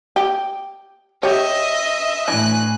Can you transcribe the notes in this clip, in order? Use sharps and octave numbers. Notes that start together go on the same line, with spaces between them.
G4
G4 C#5 D#5 E5
A2 E3 D4 G#5 F#6